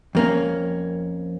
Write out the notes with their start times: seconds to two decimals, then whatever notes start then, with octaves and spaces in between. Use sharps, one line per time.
0.15 F2 A#3 C#4